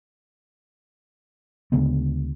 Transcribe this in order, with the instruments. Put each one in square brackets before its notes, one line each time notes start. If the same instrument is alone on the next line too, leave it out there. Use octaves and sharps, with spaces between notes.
[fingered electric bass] D2 C#3 G#3 B3